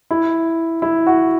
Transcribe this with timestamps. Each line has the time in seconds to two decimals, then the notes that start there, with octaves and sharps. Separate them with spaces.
0.10 E4
0.82 E4
1.07 F#4